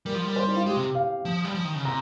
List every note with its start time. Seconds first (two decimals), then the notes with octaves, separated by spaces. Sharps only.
0.06 G3 A#4
0.15 F3
0.24 G3
0.30 A#4
0.36 C5
0.46 D#4
0.56 F4
0.65 G#3 G4
0.76 C3
0.95 F5
1.25 F3
1.45 G3
1.55 F3
1.65 D#3
1.75 C#3
1.85 C3 A#5